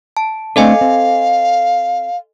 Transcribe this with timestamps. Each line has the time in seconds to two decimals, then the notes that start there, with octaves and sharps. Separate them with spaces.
0.17 A5
0.56 A3 C4 D4 A4 D#5 F5 G#5
0.81 C4